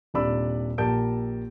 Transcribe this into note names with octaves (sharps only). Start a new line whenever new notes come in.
D#1 C3 D4 D5 B5 E6
A#1 G4 A#4 A5 G6 D7